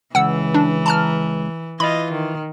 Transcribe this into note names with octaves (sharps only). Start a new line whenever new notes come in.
C#2 E3 F#5 E6
D4
A5 A#5 F6
E3 F4 D#5 B5
D#3